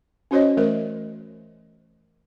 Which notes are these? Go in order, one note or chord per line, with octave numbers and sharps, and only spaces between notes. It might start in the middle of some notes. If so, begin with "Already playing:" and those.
C#4 F#4 C5 C#5 D#5
E3 A3 A#4 C5